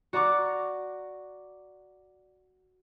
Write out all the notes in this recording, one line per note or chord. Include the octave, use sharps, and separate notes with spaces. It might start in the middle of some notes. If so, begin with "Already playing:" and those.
F#4 D5 A#5 C#6 D6